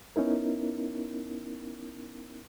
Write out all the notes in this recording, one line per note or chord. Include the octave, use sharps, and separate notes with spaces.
B3 C#4 D#4 E4 A#4